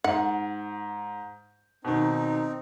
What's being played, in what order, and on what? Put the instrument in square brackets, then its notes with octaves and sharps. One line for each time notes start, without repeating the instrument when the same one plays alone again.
[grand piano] G#2 [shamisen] F#5
[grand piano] B2 D#3 [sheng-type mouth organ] C4 D#4